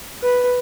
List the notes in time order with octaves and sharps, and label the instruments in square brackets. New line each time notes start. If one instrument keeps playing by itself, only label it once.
[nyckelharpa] B4